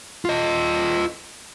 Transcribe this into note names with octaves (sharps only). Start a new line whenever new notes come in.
F4 D#5